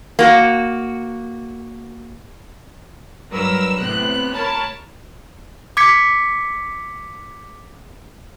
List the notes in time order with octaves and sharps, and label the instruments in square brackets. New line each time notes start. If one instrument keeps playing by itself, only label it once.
[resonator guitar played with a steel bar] A#3 F#4
[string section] G2 F#3 A#4 B4 E6 A#6
A2 C3 B3 C4 F#6
A#4 C#5 A5 B5
[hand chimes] D6 G#6 B6 C#7